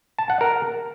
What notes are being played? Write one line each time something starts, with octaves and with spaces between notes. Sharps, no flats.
A5
F#5
A#4